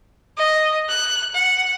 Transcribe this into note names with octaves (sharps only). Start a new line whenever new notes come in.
D#5
F#6
F#5